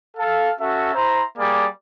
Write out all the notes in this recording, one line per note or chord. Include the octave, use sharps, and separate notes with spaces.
A4 F5
C#4 F#4 A4 E5
E4 C5 A#5 C6
G3 A#3 G#4 D5